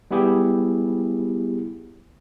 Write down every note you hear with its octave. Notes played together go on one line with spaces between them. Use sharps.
G3 B3 E4 G4 G#4